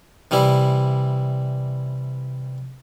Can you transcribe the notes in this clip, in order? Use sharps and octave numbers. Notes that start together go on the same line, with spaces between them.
C3 E3 G3 E4